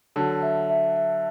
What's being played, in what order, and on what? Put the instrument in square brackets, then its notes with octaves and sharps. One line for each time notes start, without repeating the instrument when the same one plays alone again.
[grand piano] D3 F#3 [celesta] A5
[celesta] E5
E5
E5